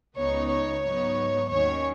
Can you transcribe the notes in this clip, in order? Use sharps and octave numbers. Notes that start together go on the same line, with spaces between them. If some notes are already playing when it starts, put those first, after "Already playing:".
C#2 C#3 B3 D#4 C#5
C#5
G#2 F#3 B3 D#4
D#2 D#3 F#3 C#4 C#5